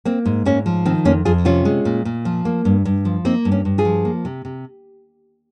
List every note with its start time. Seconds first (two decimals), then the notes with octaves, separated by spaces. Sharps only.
0.05 A#3 C4
0.25 G#2
0.45 G#2 A#3 C#4
0.66 F3
0.85 D#3 C4
1.05 F2 A#3 C#4
1.25 F2 F4 G#4
1.45 C3 C#4 F4
1.65 G#3
1.85 A#2
2.05 A#2
2.25 F3
2.45 A#3
2.65 G2
2.85 G2
3.05 F3
3.25 A#3 C4 D#4
3.45 G2
3.51 A#3 C#4
3.65 G2
3.78 F4 G#4
3.85 F3
4.05 A#3
4.25 C3
4.45 C3